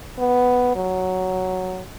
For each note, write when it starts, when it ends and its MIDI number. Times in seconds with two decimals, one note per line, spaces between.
0.19 0.73 59
0.76 1.83 54